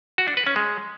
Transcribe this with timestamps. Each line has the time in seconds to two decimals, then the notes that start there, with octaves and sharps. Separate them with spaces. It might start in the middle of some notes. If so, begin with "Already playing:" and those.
0.18 F#4
0.28 D4
0.37 B4
0.47 C#4
0.56 G#3